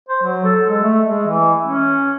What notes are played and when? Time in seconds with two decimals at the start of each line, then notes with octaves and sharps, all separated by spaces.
0.08 C5
0.23 F#3
0.45 A4
0.69 G#3
0.83 A3
1.09 G#3
1.27 E3
1.65 C#4